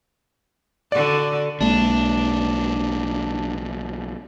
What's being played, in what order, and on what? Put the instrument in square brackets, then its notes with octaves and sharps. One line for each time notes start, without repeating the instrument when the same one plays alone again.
[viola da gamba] D3 F#4 [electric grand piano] D5
[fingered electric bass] B1 G#3 A#3 [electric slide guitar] D4